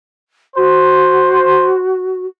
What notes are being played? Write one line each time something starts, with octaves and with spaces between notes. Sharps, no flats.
F#4 C5